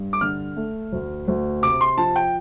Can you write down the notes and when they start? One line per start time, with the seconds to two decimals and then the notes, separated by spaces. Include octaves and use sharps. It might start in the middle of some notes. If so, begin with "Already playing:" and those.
Already playing: G2
0.13 D6
0.21 D3 F6
0.57 A3
0.92 D2
1.28 D2
1.62 C3 D6
1.81 C6
1.98 F3 A5
2.16 G5